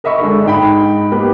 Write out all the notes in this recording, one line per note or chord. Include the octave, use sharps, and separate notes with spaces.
A#4 D#5 E5 B5 C#6
D3 G#3
G#2 D#4 G5 B5
A#3 B3 D#4 G4 B4